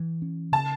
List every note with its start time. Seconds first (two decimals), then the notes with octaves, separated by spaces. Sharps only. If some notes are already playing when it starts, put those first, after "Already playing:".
Already playing: E3
0.22 C#4
0.52 C#3 A5